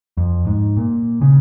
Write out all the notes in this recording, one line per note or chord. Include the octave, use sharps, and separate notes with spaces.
F2
G#2
A#2
C#3